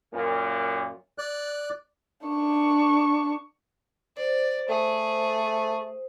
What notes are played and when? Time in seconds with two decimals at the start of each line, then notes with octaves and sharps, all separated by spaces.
0.13 F#2 A#2
1.18 D5 F#6
2.27 D4 C#6
4.17 C5 D5
4.69 A3 G#4